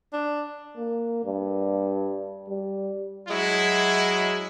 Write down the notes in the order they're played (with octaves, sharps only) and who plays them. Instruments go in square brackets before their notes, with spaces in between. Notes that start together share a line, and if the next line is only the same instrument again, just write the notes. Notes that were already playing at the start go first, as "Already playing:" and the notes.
[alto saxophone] D4
[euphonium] A#3
G2
G3
[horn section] F#3 G#3 E4